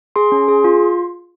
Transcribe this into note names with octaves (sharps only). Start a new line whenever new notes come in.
G#4 C6
C#4
G#4
F4